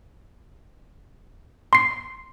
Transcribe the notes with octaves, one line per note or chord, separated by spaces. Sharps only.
C6 C7